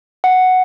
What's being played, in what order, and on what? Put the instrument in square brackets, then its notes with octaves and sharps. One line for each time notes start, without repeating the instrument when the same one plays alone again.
[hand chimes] F#5